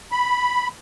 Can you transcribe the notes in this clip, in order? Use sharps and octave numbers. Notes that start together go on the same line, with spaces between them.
B5